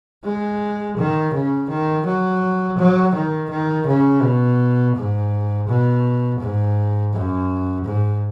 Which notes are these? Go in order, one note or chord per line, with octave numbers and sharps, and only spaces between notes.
G#3
D#3
C#3
D#3
F#3
F#3
D#3
D#3
C#3
B2
G#2
B2
G#2
F#2
G#2